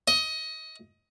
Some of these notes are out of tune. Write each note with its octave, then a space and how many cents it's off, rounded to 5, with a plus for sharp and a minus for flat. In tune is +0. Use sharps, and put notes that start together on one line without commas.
D#5 +20